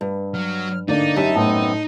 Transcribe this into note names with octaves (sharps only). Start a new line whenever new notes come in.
G2
F#3 F6
D3 A#3 D4 D#4 D5
F#2 G4 E5 A5
A2 B3 C4 A5